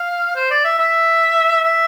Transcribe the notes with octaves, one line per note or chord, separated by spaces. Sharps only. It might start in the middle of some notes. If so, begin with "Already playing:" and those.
Already playing: F5
C5
D5
E5
E5
E5